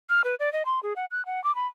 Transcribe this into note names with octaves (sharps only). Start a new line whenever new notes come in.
F6
B4
D5
D#5
C6
G#4
F#5
F#6
F#5
D6
B5